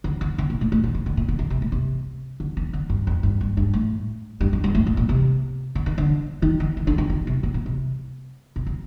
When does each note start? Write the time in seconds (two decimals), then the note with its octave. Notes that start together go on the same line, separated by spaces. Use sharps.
0.04 D3
0.21 D3
0.38 D3
0.50 A#2
0.61 A2
0.72 A2
0.84 D3
0.95 D#3
1.06 D3
1.17 A#2
1.28 D3
1.39 D3
1.50 C3
1.62 A2
1.72 C3
2.40 D3
2.57 D#3
2.73 D3
2.90 G2
3.07 F2
3.23 G2
3.41 G2
3.57 G2
3.73 A2
4.41 G2
4.53 F2
4.64 G2
4.75 A2
4.87 A2
4.97 A#2
5.09 C3
5.75 D3
5.86 D#3
5.98 D3
6.42 D#3
6.60 D3
6.77 D#3
6.87 D3
6.98 D#3
7.10 D3
7.27 C3
7.43 A#2
7.54 A#2
7.66 C3
8.56 C3
8.66 D3